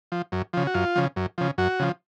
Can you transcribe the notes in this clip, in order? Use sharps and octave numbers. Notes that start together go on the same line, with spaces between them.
F3
F#2
C#3 F3
F#4
F#2 F4
C#3 F3
F#2
C#3 F3
F#2 F#4
C#3 F3